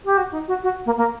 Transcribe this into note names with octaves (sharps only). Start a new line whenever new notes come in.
G4
F#4
D#4
F#4
F#4
A#3
A#3